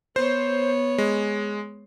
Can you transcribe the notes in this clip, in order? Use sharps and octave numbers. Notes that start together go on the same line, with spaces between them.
B3 C5 C#5
G#3